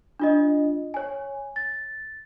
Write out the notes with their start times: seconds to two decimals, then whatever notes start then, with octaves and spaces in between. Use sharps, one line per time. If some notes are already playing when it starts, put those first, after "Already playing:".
0.20 D4 F4 D#5
0.94 C#5 G#5
1.56 A6